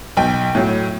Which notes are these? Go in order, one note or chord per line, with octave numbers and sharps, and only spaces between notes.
B1 G5
A2 F#3